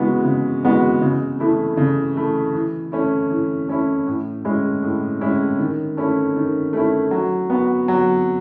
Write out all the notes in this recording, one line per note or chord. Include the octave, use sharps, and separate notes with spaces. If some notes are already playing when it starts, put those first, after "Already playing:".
Already playing: C#3 E3 G#3 B3 F#4
C#3
E3 G#3 B3 F#4
C#3
E3 A3 E4
C#3
E3 A3 E4
E3
A3 C#4 E4
E3
A3 C#4 E4
A2
G#3 C#4 E4
A2
G#3 C#4 E4
D#3
A3 C#4 E4
D#3
A3 C#4 E4
F#3
B3 F#4
F#3